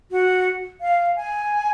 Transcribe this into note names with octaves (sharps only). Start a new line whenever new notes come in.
F#4
F5
G#5